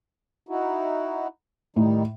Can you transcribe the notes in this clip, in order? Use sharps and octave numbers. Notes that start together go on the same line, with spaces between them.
D#4 E4 F#4
A2 D#3 G3 D#4